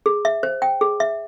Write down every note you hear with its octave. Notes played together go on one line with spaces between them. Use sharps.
G#4
E5
C5
G5
G#4
E5